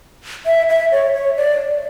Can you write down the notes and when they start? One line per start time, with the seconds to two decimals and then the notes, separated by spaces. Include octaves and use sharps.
0.46 E5
0.69 E5
0.92 C#5
1.14 C#5
1.37 D5